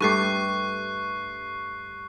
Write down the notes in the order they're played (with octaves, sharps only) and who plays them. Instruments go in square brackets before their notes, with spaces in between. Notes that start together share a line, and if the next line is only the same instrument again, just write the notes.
[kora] G2 A3 G4 [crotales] C#6 F#6 C7